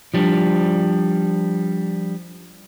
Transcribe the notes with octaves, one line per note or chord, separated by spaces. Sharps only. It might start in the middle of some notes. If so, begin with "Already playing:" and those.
F3 G3 D4